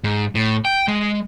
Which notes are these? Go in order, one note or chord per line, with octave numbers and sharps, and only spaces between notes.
G#2
A2
G5
G#3